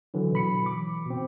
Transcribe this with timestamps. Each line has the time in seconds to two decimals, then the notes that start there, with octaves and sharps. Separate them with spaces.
0.14 D3 E3 F#3
0.32 B2 F#3 B5 C#7
0.65 E3 D6
1.06 B2 C4